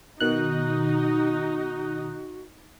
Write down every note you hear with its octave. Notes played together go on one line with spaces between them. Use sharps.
B2 D#3 D#4 F#4 F#6